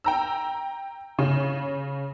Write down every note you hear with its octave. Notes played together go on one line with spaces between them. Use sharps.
G5 A#5 E6
C#3